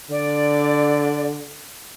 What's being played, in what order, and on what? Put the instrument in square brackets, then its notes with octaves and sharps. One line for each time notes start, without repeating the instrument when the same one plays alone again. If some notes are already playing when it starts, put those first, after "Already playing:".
[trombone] D3 [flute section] D5